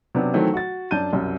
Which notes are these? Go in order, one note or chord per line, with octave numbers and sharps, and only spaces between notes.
C3 F#3 B3 D4
D#3 E3 F#3 A3 C4
F#4 A6
F#2 D4 A5 G6 D#7
C2 F#2